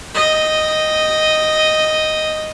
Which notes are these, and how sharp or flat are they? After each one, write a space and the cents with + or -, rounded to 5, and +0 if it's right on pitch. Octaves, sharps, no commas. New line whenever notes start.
D#5 +0 G5 +0